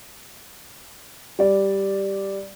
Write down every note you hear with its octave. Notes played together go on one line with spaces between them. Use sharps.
G3 D5